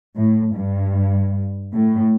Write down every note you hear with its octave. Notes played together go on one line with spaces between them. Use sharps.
A2
G2
A2